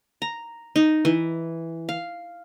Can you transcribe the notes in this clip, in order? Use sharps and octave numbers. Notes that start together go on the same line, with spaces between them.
A#5
D#4
E3
F5